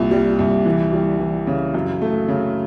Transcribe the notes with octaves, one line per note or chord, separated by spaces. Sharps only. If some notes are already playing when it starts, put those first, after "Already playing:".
Already playing: C2 A#2
G3
C2
E3
G3
E3
C#3
F#2
A3
C#3